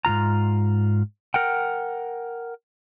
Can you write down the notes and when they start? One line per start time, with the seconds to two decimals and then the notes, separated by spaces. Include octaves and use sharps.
0.05 G#2 C3 F4 A#5
1.34 A#4 F#5 G5